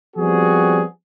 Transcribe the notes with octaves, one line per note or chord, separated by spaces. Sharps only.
F3 G3 B3 C4 F#4 G#4